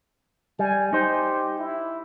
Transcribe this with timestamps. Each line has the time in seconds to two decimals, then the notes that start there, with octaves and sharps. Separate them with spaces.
0.59 G3 G#5
0.93 D#4 G4 C5
1.59 E4